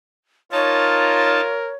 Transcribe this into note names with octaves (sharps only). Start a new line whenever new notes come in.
D#4 F4 A#4 C#5 A5